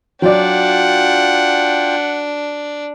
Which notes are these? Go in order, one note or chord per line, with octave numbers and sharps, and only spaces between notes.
F#3 D4 F4 D5 F#5 G5